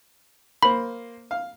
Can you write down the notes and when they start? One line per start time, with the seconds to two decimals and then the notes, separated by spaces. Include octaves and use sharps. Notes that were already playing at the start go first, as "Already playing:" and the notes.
0.63 A#3 C5 B5
1.31 F5